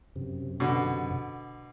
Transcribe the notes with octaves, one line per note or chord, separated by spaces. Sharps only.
F#2 C3
B2 D3